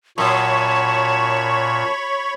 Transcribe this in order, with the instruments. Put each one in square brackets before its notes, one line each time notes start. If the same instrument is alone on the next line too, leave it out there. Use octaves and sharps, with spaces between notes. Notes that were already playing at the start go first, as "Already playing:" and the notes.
[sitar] F#2 [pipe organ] A#2 [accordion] C#5 B5 C#6 [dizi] A5